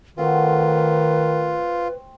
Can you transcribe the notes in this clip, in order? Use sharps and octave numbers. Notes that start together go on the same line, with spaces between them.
D#3 A3 C4 F4 F#4 B4